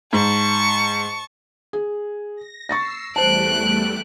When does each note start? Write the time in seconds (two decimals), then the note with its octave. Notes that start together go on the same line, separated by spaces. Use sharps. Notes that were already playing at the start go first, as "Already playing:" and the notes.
0.13 G#2 A5 C#6
1.73 G#4
2.36 A#6
2.69 C#6 E6 A6 A#6 C7
3.16 E2 G3 A3 C5 A5 F#6 D7